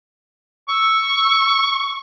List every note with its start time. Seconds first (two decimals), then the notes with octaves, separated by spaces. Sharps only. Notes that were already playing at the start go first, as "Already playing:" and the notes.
0.69 C#6 E6